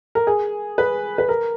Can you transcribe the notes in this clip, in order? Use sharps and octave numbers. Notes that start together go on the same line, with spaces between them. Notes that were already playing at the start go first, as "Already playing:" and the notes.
A#4
G#4
B4
B4
A#4